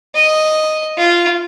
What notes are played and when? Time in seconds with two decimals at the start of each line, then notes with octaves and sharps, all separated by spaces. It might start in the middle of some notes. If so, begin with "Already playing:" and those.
0.15 D#5
0.98 F4